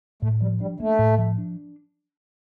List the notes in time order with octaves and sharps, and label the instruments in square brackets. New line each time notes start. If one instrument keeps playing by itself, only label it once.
[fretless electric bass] A2 [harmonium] A3
[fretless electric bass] F3 [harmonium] G3
[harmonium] G3 [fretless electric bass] D4
[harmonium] A3 [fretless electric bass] A#3
[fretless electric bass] A2
F3
D4